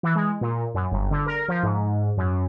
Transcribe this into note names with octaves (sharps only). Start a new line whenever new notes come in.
E3
G#3
A#2
F#2
G1
D3
A#4
F3
G#2
F#2